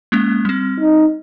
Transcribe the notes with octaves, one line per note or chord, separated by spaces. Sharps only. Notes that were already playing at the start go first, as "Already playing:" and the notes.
G#3 A#3 C#4
G3 C4
D#4